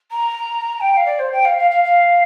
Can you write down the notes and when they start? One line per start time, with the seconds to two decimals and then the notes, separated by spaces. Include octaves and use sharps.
0.11 A#5
0.80 G5
0.97 F5
1.06 D5
1.19 C5
1.32 G5
1.45 F5
1.57 F5
1.71 F5
1.84 F5